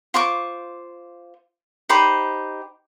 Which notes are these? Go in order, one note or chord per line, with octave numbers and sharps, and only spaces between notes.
F4 C5 C#6 D6
D#4 G4 C5 B5